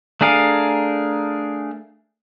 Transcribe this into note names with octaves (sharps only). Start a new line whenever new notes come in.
A3 D4 G#4 A#4 F5